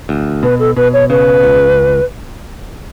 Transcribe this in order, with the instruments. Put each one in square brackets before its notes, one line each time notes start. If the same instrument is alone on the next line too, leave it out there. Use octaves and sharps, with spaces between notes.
[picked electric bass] D2
[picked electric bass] B2 [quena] B4
[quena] A4
[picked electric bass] B2 [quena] B4
[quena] C#5
[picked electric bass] C#3 [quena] B4
[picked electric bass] C#2